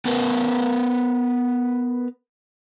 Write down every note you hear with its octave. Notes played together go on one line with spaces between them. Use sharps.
B3 A#4 B4 A5